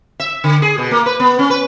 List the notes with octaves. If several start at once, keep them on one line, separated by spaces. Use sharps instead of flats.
E5
D3
G#4
B2
A#3
B4
B3
C#4
B4